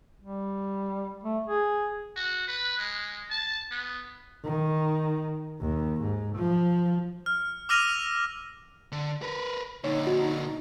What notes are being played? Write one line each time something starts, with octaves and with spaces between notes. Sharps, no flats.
G3
A3
G#4
F#4
B4
G#3
A5
B3
D#3
D#2
G#2
F3
F6
D6 E6 F6 A#6 D#7 F7
D3
A#4 B4
A#2 D3 D#4 C#5
F#4